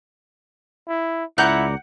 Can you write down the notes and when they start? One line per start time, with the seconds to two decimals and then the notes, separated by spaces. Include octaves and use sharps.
0.88 E4
1.38 C#2 E4 D5 F#5 A#5 G6